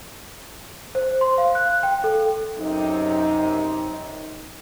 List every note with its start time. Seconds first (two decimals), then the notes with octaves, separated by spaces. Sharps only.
0.95 C5
1.21 C6
1.38 F5
1.55 F#6
1.83 G5
2.04 A4
2.58 F#2 C3 D#4